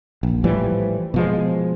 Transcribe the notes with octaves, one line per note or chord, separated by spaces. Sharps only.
A#1
A2 E3 F3 G3
B2 F3 G#3